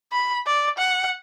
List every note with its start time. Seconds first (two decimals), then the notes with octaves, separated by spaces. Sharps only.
0.12 B5
0.46 D5
0.78 F#5